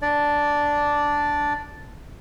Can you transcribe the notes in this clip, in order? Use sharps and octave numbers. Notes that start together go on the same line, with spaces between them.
D4 D5